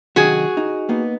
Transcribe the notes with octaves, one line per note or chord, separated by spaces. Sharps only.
C3 D#3 F#3 F#4 G#4
D#4
A#3 B3 D#4